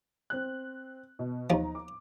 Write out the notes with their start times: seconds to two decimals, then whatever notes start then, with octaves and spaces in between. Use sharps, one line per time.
0.30 C4 F#6
1.19 B2
1.50 D#2 F3 D#4 A#5
1.75 D6